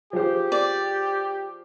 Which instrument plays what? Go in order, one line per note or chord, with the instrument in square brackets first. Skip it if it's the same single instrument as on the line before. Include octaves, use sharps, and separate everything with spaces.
[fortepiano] F3 G#4 C5 [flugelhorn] G4
[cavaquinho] D5